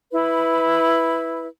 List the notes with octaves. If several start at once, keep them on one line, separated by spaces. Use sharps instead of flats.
E4 B4